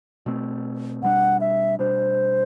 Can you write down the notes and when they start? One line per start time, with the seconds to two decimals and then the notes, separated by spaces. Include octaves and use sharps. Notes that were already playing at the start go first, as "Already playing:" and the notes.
0.26 B2 A3 C4
1.02 B2 G3 D4 F#5
1.41 E5
1.79 B2 G3 D4 C5